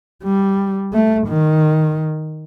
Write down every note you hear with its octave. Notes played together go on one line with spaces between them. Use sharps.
G3
A3
D#3